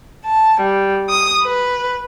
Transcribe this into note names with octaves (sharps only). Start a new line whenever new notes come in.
A5
G3
D#6
B4